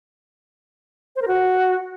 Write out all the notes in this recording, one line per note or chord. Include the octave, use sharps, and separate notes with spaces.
C5
A#4
F#4